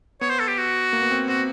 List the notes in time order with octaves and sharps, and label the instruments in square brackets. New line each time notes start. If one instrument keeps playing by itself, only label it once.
[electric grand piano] B3 [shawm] C#5
[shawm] C5
A4
G4
F#4
[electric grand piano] A#3
B3
C4
[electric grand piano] C4 [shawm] F#4